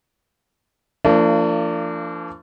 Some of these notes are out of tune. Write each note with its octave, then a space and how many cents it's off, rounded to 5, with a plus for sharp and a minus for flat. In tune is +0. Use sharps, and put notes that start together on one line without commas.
F3 -35 A#3 -45 D4 -5